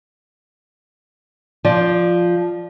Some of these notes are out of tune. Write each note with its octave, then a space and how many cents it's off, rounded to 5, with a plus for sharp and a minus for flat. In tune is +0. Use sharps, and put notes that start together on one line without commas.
F3 +0 D5 +15